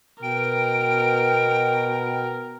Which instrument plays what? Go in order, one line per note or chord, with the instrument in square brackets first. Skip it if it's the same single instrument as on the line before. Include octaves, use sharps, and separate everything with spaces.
[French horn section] B2 [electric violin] A#4 [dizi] G5 [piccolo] D7